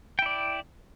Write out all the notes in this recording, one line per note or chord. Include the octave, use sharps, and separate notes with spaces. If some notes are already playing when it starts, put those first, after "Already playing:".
E4 D5 G5